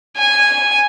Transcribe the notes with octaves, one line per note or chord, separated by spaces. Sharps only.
G#5